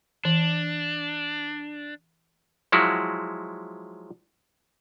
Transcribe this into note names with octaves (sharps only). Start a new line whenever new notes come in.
E3 D4
F3 F#3 G#3 E4 F#4